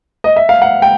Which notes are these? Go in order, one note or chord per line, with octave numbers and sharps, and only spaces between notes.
D#5
E5
F5
F#5
G5